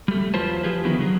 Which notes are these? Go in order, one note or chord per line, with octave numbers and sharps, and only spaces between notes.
G3 A3
E2 F#3 F4 B4 C5 A5
F3 F4 G4 G#4 B4
D3 D#3 B3 E4
C#3 F#3 G#4